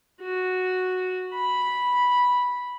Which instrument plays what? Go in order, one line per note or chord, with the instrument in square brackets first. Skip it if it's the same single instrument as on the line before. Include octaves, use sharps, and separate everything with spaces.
[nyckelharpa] F#4
B5